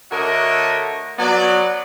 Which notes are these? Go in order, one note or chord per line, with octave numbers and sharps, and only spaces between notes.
D3 A3 F#4 A#4 C#5 D#5
F#3 B3 D5